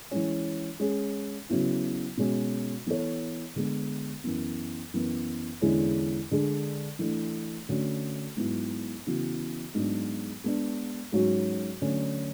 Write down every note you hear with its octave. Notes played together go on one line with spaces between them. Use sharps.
E3 G#3 C#4
G#3 C#4 G#4
C#3 F#3 B3 E4
B2 G#3 C#4 F#4
E3 B3 E4 A4 C#5
D3 G#3 B3
F#2 E3 B3
F#2 E3 B3
E2 D3 G#3 C#4 E4
D3 G#3 D4 G#4
E3 A3 D4
D3 A3 C#4 F#4
G#2 F#3 B3 E4
C#3 E3 B3 F#4
G#2 F#3 B3 D4
G#3 B3 D4
G#2 F#3 C#4 F#4
D3 F#3 A3 C#4